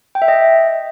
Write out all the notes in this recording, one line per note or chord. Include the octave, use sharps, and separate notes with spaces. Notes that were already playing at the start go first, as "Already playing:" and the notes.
G5
E5
D#5